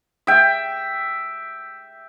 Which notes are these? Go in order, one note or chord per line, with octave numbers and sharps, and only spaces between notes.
E5 G5